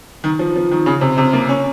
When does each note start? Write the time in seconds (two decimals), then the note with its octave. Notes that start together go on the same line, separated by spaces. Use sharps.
0.24 D#3
0.39 F3
0.56 F3
0.71 D#3
0.86 C#3
1.01 C3
1.18 C3
1.33 A#3
1.49 C#4